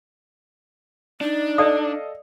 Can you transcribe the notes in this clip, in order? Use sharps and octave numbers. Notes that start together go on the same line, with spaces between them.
D4 D#4
A4 D5 D#5 F5 D#6